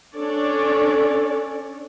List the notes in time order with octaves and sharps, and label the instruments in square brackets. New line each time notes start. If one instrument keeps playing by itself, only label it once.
[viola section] C#4 D4 A4 C#5 D5